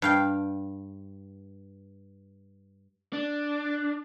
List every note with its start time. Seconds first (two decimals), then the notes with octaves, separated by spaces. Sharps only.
0.02 G2 F5 G5
3.13 D4